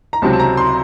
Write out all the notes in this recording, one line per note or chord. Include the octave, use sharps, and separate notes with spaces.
A#5
C#2 C3 F#3 C4 A5
A5
A#5
C6